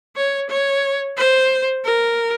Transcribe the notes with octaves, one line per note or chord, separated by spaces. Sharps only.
C#5
C#5
C5
A#4